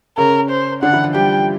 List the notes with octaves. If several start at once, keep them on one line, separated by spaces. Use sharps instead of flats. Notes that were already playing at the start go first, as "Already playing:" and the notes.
C#3 C#4 A#4
C5
D3 D4 F#5
E3 E4
F3 F4
G3 G4 G5